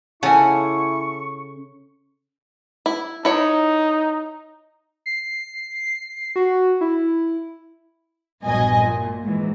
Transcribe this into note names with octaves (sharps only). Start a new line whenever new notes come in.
C#3 E4 A4 F#5 G#5 C#6
E4
D#4 E4 C#5
C7
F#4
E4
A#1 G2 B2 F#3 D#5 G#5
A#2
G#2 E3 F#3